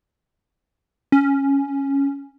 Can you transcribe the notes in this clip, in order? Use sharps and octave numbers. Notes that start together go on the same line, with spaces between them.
C#4